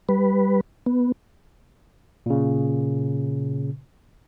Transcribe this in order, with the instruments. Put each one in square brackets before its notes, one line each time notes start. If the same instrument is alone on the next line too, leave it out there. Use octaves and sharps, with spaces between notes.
[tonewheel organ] G3 B4
B3
[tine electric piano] A#2 C#3